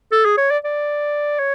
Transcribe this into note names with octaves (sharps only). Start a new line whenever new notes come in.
A4
G#4
C#5
D5
D5
C#5